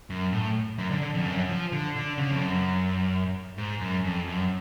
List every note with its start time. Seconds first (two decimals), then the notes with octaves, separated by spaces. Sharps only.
0.10 F#2
0.33 A2
0.78 F#2
0.91 D3
1.02 D3
1.14 F2
1.25 F#2
1.49 F3
1.72 D3
1.96 D3
2.18 C#3
2.31 F2
2.42 F#2
3.58 G#2
3.81 F#2
4.04 F2
4.27 F#2